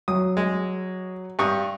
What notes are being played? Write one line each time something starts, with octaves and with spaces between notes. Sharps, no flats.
F#3 D#6
G#3
G2 C#6 D#6